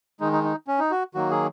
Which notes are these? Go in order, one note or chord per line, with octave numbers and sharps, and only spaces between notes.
D#3 G#3 D#4
D#4
D#4
C#4
D#4
F#4
D#3 F#3 A#3 F#4
G#4